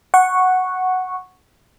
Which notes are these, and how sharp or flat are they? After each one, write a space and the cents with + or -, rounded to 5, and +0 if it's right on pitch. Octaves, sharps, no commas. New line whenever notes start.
F#5 +0 C#6 -5